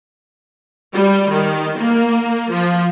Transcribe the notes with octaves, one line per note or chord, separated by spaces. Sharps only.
G3
D#3
A#3
F3